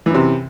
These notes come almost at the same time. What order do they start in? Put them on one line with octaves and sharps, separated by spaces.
E3 F#2 C3